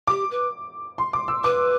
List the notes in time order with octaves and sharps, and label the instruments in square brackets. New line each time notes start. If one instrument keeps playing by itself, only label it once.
[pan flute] G4 [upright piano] D6
[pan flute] B4
[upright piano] C6
D6
E6
[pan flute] B4 [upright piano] D6